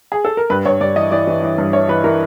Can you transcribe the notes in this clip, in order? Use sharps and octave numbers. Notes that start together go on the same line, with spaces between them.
G#4
A4
A#4
G2 B4
G2 C#5
G2 D5
E3 D#5
E3 D5
E3
E3
G2
E3 C#5
E3 B4
E3 A#4